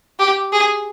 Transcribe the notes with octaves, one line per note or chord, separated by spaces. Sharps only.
G4
G#4